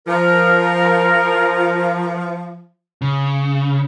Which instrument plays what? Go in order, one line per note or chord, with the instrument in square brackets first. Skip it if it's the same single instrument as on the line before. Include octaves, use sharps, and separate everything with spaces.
[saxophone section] F3 [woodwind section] A#4
[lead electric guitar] C#3